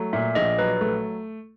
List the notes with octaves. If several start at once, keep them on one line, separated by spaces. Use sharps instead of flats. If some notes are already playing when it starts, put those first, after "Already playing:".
Already playing: F#3 A3
A#2 E5
A#1 D#5
F#3 B4
A3